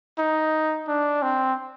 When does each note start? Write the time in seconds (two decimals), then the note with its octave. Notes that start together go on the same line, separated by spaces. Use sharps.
0.18 D#4
0.88 D4
1.22 C4